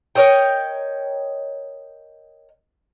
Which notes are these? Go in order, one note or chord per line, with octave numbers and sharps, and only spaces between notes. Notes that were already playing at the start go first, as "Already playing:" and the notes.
A#4 C#5 D#5 G5